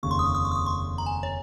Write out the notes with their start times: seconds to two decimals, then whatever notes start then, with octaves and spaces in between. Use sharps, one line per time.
0.03 F1 D#2 C#3 C#6
0.11 C6
0.19 D#6
0.26 C#6
0.35 D#6
0.45 C#6
0.52 D#6
0.55 C#6
0.66 C6
0.98 A#5
1.06 G#5
1.23 C#5